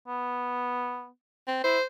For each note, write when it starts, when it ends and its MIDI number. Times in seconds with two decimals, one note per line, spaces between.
0.08 1.08 59
1.48 1.64 60
1.64 1.78 64
1.64 1.84 72